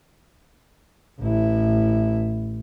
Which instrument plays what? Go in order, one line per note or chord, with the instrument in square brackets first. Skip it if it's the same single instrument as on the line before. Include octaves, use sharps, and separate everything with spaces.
[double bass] A1 E4